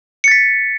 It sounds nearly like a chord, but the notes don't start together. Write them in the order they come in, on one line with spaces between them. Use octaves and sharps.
C#7 A6 B6